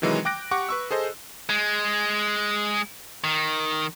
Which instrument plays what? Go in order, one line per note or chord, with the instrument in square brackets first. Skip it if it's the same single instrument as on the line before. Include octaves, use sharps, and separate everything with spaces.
[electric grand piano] C3 D#3 E3 F#3 G#3
G5 D6 F#6 A#6 D7
G4 F#5 C#6 D6
B4 C#6 E6
G#4 A4 C5 D#5
[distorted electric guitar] G#3
D#3